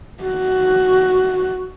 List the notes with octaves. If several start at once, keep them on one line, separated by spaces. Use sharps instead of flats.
F#4